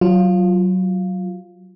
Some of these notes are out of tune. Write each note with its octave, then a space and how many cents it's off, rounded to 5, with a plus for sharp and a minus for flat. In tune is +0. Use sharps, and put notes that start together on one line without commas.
F#3 +10 F4 +0